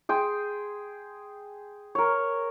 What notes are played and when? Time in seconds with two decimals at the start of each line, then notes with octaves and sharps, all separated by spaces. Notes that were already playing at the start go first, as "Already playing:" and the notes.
0.09 G#4 G5 C6
1.95 A#4 C#5